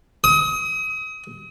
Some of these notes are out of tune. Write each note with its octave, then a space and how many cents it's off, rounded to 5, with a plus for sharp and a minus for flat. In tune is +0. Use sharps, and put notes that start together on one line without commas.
D#6 +35